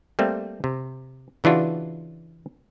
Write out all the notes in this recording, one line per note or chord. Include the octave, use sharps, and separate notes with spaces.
G3 A3 A#3 C4
C3
C#3 E3 D4 F4 F#4